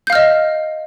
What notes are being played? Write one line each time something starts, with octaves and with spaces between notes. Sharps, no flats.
D#5 F5 F6 G6